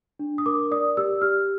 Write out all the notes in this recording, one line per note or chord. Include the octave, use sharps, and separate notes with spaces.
D4
D#6
A#4 D6
D5 D#6
G4 E6
G4 F6